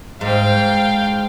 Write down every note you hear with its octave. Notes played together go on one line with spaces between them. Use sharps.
G#2 F5 G5